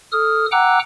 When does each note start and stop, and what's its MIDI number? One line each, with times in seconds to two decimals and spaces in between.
0.12 0.46 69
0.12 0.46 87
0.12 0.46 89
0.52 0.79 78
0.52 0.79 79
0.52 0.79 82
0.52 0.79 86
0.52 0.79 88
0.52 0.79 90